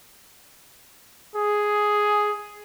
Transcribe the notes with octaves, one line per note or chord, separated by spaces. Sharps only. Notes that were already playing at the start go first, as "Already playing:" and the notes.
G#4